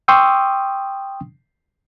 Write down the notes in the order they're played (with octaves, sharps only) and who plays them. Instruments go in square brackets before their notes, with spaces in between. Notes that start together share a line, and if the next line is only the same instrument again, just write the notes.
[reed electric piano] G5 C6 C#6 D#6 E6